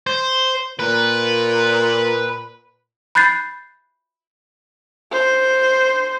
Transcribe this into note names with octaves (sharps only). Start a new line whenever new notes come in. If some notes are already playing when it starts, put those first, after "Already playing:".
C5
A#2 B4
B5 F#6 G6 A6 C7
C5